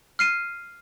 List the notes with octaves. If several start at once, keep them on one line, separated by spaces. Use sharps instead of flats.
F6 C7 D#7